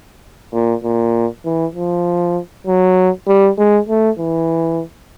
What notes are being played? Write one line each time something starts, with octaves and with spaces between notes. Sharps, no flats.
A#2
A#2
E3
F3
F#3
G3
G#3
A3
E3